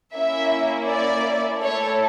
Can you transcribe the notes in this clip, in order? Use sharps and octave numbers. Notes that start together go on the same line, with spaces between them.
A#3 C#4 E4 E5
D5
A3 E4 A4 C#5